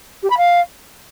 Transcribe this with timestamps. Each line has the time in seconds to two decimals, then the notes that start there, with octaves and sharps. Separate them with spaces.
0.23 G4
0.30 B5
0.37 F5